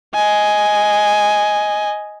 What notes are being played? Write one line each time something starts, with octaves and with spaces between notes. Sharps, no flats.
D#5 G#5